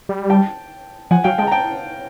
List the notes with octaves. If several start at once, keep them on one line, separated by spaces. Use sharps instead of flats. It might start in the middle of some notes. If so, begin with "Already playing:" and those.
G3
G5 A5
F3 F#5 G#5
F#3 F5 G5
G#3 G5 A5
A#5
G5 A5